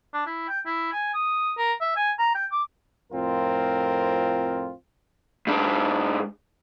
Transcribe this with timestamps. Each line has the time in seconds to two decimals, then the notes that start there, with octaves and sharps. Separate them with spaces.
0.13 D4
0.27 E4
0.49 G5
0.66 E4
0.93 G#5
1.14 D#6
1.58 A#4
1.81 E5
1.96 G#5
2.19 A#5
2.35 G5
2.52 D6
3.13 F2 A2 C4 F4 A#4
5.47 G#2 D4